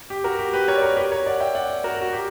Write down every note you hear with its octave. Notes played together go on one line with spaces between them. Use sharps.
G4
F#4 A#4
G4
G4 B4
A#4 C#5
D5
A#4 C#5
G4 B4
A#4 C#5
D5 F#5
E5 G5
D5 F#5
F#4 A#4
F#4
G4